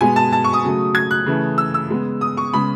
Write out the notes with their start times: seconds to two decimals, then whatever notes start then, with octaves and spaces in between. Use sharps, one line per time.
0.01 B2 G#3 B3 G#5
0.16 A5
0.33 A5
0.44 C#6
0.53 D#6
0.63 C#3 F#3 A3
0.95 G#6
1.11 F#6
1.26 C#3 E3 A3
1.58 E6
1.74 E6
1.90 C#3 G#3 B3
2.21 D#6
2.37 C#6
2.53 C#3 G#3 B3 B5